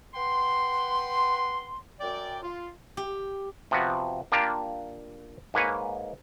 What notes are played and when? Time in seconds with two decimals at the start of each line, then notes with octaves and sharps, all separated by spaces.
0.14 B4 F#5 G5 C6
2.00 F#2 D5 G5
2.43 F4
2.97 G4
3.71 C3 F3 B3 F#4
4.32 A#3 D4 F4 G4 A#5
5.54 G#2 A#3 B4 C#5 G#5